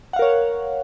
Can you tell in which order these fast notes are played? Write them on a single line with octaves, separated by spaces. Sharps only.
F#5 F5 A#4 C#5